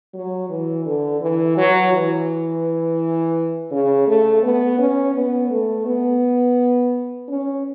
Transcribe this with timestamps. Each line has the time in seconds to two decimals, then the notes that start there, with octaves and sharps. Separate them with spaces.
0.14 F#3
0.50 E3
0.85 D3
1.21 E3
1.57 F#3
1.93 E3
3.71 C#3
4.07 A3
4.43 B3
4.79 C#4
5.14 B3
5.50 A3
5.86 B3
7.28 C#4